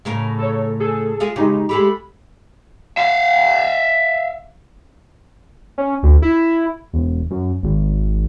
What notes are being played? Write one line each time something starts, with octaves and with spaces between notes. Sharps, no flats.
A2 C#3 A#4
A4 C#5
G#4 A4
G#3 F4 G#4
C#3 G#3 D#4 G4
G#3 A3 G4 B5
E5 F5
C#4
D2
E4
E1
F#2
G#1